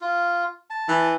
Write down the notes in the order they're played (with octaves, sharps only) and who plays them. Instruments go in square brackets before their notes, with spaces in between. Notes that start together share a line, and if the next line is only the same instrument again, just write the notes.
[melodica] F4
A5
[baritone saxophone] E3